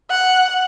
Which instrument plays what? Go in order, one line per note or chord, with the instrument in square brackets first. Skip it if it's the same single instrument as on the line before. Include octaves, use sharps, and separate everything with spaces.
[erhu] F#5